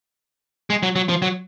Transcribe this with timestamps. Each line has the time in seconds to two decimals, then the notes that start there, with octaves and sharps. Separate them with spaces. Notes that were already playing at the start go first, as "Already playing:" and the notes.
0.70 G#3
0.83 F#3
0.96 F#3
1.09 F3
1.22 F#3